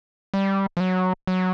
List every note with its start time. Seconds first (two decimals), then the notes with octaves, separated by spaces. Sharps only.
0.34 G3
0.77 F3
0.80 F#3
1.27 F#3